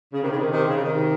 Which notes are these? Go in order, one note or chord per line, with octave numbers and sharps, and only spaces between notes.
C#3
C3 D#3
C#3
C3 D#3
C3 D#3
C#3
C3 D#3